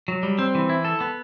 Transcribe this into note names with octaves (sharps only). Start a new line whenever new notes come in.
F#3
G3
C4
E3
E4
A4
B3